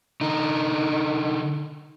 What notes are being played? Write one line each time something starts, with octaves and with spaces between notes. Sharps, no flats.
D3 D#4